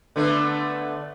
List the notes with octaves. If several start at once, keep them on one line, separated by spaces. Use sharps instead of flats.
D3 A3 B3